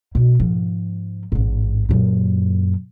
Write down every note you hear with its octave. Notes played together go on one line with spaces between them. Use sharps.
B2 G3
G#2 F3
A1 G#2
F#2 A#2